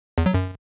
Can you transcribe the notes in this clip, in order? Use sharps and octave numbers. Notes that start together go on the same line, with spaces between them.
E2
F#3
F#2